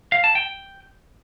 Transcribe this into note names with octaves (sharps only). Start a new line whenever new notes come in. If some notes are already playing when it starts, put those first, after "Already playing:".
F5
A5
G5